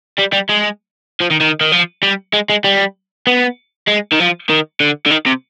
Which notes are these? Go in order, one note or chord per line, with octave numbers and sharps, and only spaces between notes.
G3
G3
G#3
F3
D#3
D#3
D#3
F3
G3
G#3
G#3
G3
B3
G#3
D#3
F3
D#3
D3
D3
D#3
C3